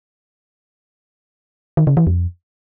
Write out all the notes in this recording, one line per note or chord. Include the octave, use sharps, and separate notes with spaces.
D#3
C#3
E3
F2